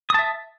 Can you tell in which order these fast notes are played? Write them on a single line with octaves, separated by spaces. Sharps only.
D#6 A5 E5